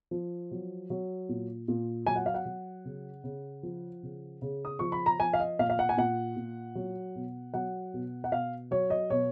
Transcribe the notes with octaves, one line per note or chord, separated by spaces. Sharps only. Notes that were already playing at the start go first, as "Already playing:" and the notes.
F3
F#3
F#3
A#2
A#2
F#3 G#5
F#5
F5
F#5
F#3
C#3
C#3
F3
C#3
C#3
D#6
F3 C#6
B5
A#5
F3 G#5
F5
D#5
A#2 F5
F5
F#5
G#5
A#2 F#5
A#2
F#3
B2
F#3 F#5
B2
F#5
B2 F5
F#3 C#5
D#5
B2 C#5